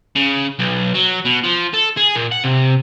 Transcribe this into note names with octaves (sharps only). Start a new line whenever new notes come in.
C#3
B1
F#3
B2
F3
A4
G#4
A#2
F#5
C3